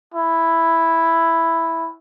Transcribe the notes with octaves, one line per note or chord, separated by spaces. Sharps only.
E4